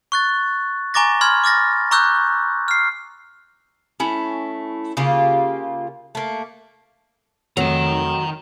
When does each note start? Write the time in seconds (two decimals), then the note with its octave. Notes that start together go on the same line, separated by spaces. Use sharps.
0.12 C#6 F#6 A6
0.94 G#5 A#5 C#6 D6 A6 A#6
1.21 B5 C6 F6 G#6
1.44 D6 F6 A6 A#6
1.91 A#5 C#6 D6 E6 F#6 G6
2.68 F6 C7
4.00 A3 C#4 E4
4.97 C#3 A#3 F4 G4
6.15 A3 A#3
7.57 F1 D#3 F#3 G5 A#5